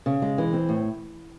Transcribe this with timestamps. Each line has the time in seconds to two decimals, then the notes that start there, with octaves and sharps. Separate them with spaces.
0.06 C#3
0.22 G#3
0.38 E3
0.53 C4
0.69 A2